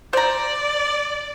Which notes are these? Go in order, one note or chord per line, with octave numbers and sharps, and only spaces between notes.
C5 D5 A#5